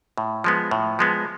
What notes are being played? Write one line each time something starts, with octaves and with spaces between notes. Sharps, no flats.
A2
F3 G#3 B3
A2
F3 G#3 B3